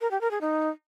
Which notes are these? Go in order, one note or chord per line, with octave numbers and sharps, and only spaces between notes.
A#4
G4
A#4
G#4
D#4